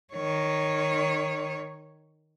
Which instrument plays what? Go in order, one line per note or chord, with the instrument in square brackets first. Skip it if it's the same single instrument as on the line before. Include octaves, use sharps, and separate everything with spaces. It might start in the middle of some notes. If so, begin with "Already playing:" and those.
[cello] D#3 C#5